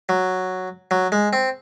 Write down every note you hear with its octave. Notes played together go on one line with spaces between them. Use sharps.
F#3
F#3
G#3
C4